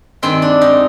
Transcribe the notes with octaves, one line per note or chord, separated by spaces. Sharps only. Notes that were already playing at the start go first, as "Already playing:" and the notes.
G2 D#3 G#3 C4
D4
D#4